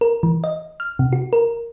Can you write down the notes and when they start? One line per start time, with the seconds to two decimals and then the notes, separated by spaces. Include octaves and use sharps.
0.01 A#4
0.23 E3
0.44 D#5
0.80 F6
0.99 C3
1.13 F#4
1.33 A#4